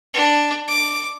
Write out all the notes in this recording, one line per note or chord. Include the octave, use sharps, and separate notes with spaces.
D4
D6